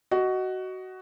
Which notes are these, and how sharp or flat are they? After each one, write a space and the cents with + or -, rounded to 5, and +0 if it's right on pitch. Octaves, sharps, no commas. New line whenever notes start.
F#4 +15 D#5 +0